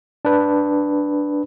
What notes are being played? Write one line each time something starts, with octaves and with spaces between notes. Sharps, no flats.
D4 B4